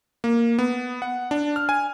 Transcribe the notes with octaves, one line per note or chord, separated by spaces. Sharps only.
A#3
B3
F#5
D4
F6
G#5